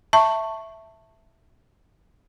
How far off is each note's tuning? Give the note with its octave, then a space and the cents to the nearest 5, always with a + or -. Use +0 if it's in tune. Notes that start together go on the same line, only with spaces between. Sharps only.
E5 +0 A5 +15 C#6 -5